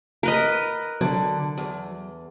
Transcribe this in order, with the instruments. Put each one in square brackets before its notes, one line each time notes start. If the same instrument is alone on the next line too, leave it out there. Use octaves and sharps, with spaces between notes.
[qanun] A#4 B4 D#5
[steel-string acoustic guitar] D3 [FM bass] F#3
[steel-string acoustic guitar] E2